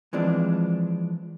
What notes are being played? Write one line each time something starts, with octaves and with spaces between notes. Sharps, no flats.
E3 F3 G#3 C4 D4